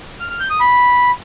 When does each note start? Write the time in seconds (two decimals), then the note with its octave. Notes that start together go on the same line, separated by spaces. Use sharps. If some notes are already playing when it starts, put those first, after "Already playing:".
0.20 F6
0.30 F6
0.40 G6
0.50 D#6
0.60 B5